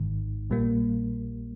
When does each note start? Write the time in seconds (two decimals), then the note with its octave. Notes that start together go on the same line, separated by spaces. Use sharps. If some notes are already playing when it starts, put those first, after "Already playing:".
Already playing: G#1 G#2 D#3
0.50 A#1 A#2 G3 A#3